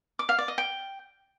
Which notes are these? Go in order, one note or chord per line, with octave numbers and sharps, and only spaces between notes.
D6
F5
D5
D#5
G5